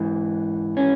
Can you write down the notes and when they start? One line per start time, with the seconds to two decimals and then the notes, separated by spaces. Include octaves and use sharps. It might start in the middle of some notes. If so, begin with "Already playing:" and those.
Already playing: G#2 E3
0.77 C#4